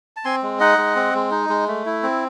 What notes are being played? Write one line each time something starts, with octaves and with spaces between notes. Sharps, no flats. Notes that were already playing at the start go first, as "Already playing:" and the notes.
A5
C4 G#5 C6
G#3
D#4 D#5 F#5
G#3
C4
G#3
D#4
G#3
A3
E4
C4